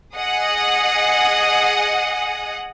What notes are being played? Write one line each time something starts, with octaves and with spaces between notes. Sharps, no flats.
G#4 D#5 F#5 D#6